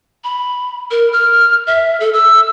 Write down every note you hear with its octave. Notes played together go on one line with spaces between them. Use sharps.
B5
A#4
F6
E5
A4
E6